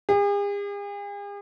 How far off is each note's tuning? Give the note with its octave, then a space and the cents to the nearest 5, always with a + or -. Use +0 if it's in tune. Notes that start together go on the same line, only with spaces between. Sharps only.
G#4 -45